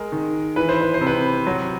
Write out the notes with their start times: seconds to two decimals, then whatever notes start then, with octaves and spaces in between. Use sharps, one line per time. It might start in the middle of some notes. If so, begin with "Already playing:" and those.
Already playing: G#3 A#4
0.12 D#3
0.56 E3 B4
0.69 C5
0.81 B4
0.94 C5
1.01 C3
1.07 B4
1.47 F#3